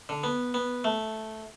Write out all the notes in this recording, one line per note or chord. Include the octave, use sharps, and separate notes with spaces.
D3
B3
B3
A3